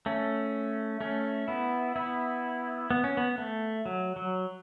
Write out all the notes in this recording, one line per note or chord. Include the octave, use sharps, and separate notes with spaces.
A3 C#4
A3 C#4
B3 E4
B3 E4
B3
C#4
B3
A3
F#3
F#3